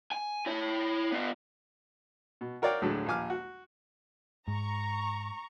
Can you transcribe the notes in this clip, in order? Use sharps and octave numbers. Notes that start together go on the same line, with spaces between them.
G#5
E4 C#5
B3 F4
B2
F#4 A#4 C#5 D5 F5 G5
D2 A2 D3 F#3 G#3
A#1 D#2 F3 G#5 D6 F6
F#4
G#2 A#5 C#6